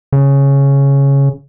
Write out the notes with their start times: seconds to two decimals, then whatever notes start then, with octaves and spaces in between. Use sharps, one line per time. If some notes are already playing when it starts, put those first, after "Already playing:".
0.12 C#3